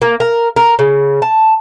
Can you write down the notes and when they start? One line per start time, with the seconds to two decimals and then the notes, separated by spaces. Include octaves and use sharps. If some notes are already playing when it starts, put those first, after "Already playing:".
0.02 A#3
0.20 A#4
0.56 A#4
0.79 C#3
1.22 A5